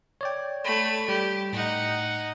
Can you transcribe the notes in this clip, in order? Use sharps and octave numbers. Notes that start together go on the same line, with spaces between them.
C#5 D5 G5
A3 B5
G3 G4
A2 D#4 F#5